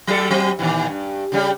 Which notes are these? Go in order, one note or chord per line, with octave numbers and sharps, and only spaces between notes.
F#3 G3 A4
F#3 C4
A#2 D#3 E3
G2
C#3 G3